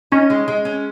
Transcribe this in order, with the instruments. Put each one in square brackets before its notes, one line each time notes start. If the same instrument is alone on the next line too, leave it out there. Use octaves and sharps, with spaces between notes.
[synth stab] C#4 [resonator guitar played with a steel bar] D#4
[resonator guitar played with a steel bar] G#3
G#3
C#4